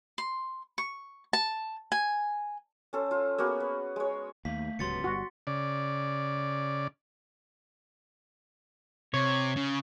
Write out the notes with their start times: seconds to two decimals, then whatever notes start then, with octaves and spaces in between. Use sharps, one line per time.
0.18 C6
0.78 C#6
1.33 A5
1.92 G#5
2.93 C#4 A4 C5
3.11 F4
3.38 A#3 B3 F#4 G#4
3.60 B4
3.96 G#3 C#5
4.45 D#2 A3 F5 B6
4.79 D1 C#2 F#3 B3 G4 C6 A6 C#7
5.04 G1 C3 G3 F#4
5.47 C#3 D5
9.14 C3 C#5
9.57 C#3